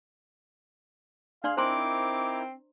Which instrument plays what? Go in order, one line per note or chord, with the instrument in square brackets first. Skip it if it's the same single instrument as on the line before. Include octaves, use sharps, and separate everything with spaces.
[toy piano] D4 D5 C6 [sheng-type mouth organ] G#4 [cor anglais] F5
[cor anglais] C4 [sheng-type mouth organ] D#4 E4 A#4 [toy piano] C5 A#5 C6 [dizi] D6